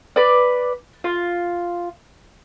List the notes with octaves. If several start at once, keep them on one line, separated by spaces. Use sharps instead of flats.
B4 D5
F4